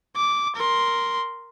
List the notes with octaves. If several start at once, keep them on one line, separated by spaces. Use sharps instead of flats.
D6
A#4 C6